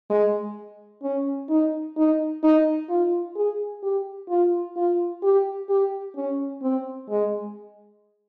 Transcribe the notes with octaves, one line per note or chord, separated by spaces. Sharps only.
G#3
C#4
D#4
D#4
D#4
F4
G#4
G4
F4
F4
G4
G4
C#4
C4
G#3